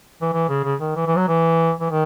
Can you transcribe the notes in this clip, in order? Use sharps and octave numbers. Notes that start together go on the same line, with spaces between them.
E3
E3
C#3
C#3
D#3
E3
E3
F#3
E3
E3
D#3